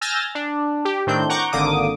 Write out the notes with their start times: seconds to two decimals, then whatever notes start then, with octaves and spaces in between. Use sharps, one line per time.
0.01 G#5 E6 F6 G6 A6 A#6
0.35 D4
0.85 G4
1.07 A2 D#3 C4 D4 G6
1.29 F#5 A#5 C#6 D6 G6
1.52 G#1 D3 A#3 D6 D#6